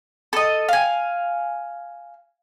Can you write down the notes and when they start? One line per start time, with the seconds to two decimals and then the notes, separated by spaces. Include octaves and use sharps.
0.33 A4 D#5
0.69 F5 G#5